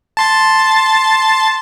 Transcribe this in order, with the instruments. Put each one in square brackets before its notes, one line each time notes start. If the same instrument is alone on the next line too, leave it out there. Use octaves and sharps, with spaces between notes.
[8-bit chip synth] A5 C6 A6